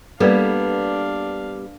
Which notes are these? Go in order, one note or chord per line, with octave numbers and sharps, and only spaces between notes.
G3 A#3 B3 D4 A4 B4 D5 F5